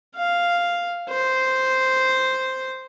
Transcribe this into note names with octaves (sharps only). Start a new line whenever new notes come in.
F5
C5